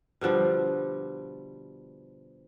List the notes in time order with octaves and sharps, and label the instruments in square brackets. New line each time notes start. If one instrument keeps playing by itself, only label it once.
[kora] B2 D3 F3 G3